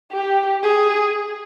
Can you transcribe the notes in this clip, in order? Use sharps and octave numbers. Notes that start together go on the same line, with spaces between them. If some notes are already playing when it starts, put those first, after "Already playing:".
G4
G#4